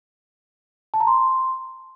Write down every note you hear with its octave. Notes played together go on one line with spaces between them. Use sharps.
A5
A#5
C6